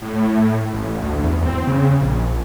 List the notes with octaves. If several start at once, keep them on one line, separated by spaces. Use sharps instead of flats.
A2
A1
D2
E2
C4
C#3
A#1